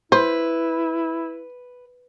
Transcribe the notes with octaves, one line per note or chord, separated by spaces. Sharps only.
E4 B4 C5